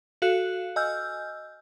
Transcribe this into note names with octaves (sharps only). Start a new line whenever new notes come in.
F#4 A4 F5 F#6
D#5 G#5 E6 F6 G6